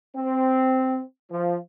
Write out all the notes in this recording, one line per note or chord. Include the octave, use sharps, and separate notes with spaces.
C4
F3